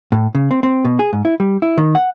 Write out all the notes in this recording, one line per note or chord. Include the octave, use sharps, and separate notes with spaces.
A2
C#3
C4
C4
B2
G#4
G#2
E4
G3
E4
D#3
F#5